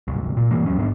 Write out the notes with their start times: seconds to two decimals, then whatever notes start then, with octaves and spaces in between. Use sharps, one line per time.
0.08 D1 C2
0.37 A#2
0.51 G2 E3 A#3
0.66 D#2 F#3 C#4
0.78 G#2 B3 D4